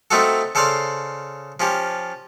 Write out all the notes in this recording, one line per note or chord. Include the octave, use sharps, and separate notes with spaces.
A3 C4 D#4 F4 F#4 A4
C#3 A4 C5 D5 F5 C6
F3 C#4 G4